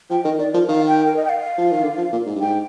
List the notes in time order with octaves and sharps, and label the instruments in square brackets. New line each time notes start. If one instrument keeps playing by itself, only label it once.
[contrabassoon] F3 [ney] G5
[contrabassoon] D#3 [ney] D#5
[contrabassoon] D#3 [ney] D5
[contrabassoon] F3 [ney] A#4
[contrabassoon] D#3 [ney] F5
[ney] G5
A#4
D#5
G5
F5
[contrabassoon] F3
D#3
D3
F3
A#2
G#2
G2
[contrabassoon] G#2 [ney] G5